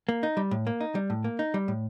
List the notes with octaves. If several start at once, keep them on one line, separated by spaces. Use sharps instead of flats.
A#3
D#4
G3
A2
A#3
D#4
G3
A2
A#3
D#4
G3
A2